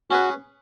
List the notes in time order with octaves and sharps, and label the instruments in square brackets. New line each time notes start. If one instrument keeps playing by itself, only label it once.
[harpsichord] C#4 G#4 B4 [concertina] F#4